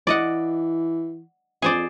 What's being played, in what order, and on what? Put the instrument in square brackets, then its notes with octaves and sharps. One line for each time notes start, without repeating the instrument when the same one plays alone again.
[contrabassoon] E3 [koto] D5 D#5 F#5
[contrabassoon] F2 [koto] G#4 C5 D5